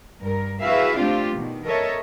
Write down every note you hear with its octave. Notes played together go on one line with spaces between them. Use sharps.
G2 A#4
E4 F#4 G#4 B4 E5 F5
A3 C4 D4 F4 G4
B2 D#3
A4 A#4 C#5 D#5 E5